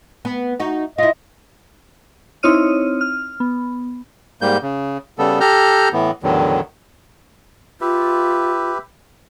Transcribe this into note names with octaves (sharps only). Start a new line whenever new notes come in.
B3
D#4 F#4
E4 F4 D#5
C4 D#4 E4 C#5 F6 D#7
F6
B3
G#2 G3 A#3 G6
C#3
C#3 G3 B3 A4
G4 A4 A#5 F6 G6
A2 E3 B3
E2 A2 D3 D#3 F#3
F4 G4 B4 E5